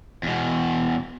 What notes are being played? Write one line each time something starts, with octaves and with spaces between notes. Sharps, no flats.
E2 B2